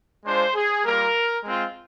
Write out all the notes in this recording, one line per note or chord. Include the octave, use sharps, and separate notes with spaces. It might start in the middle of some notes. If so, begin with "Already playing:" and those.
G#3 D4 F4 C5
G#4
G3 A#3 F4 A#4
G#3 C4 F4